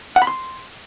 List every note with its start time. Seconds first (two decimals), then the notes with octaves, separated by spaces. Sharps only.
0.16 F#5
0.22 B5
0.27 C6